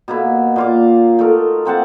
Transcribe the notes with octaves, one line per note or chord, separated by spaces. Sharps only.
B2 A#3 E4
A#2 F4 D6
A3 D#4 A#4
A#3 C4 F#5 A5